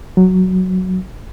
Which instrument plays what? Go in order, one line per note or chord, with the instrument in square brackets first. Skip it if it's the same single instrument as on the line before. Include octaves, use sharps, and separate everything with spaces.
[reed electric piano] F#3